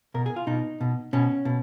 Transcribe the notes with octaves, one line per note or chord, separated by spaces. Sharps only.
B2 A#4
G#4
F4
B2 D#4
B2
B2 C#4
B2